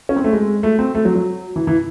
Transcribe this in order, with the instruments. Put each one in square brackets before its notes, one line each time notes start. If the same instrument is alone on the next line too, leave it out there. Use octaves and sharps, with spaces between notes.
[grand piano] C#4
C4
A3
G#3
A3
C4
A3
F#3
F#3
E3
E3